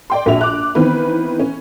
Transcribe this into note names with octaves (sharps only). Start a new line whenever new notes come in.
D5 G5 C6
A#1 F#4 E5 F7
D6 F#6
D#3 E3 B3 C4 B4
C#4